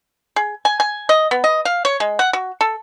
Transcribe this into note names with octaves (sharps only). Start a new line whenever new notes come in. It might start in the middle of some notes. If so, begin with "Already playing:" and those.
G#4
G#5
G#5
D#5
B3
D#5
F5
C#5
G#3
F#5
F#4
A4